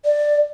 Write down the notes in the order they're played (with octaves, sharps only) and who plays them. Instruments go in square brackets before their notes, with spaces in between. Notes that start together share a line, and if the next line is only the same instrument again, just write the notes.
[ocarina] D5